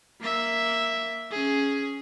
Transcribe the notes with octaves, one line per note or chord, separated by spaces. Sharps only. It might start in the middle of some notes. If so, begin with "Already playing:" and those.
A#3 E5
C#4 G#4